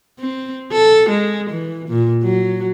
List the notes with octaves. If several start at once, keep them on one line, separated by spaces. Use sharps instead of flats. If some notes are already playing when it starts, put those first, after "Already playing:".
C4
A4
G#3
E3
A#2
F#3